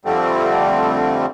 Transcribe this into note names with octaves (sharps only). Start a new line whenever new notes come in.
F2 D3 G3 A3 C4